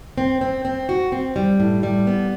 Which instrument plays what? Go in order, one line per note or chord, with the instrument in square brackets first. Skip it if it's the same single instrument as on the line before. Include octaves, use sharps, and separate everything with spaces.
[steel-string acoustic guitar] C4
C4
C4
F#4
C4
G3
A2
G3
B3